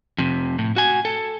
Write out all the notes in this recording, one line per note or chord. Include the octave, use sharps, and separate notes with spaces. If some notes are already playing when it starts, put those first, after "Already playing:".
F2 C3
A2
F#4 G#5
A4